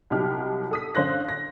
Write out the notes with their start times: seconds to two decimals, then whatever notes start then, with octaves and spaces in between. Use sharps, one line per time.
0.10 C2 F#3 D#4 G4 F6
0.71 A4 D#6 B6
0.95 D3 C#4 C5 F5 F#6 A#6
1.28 A#6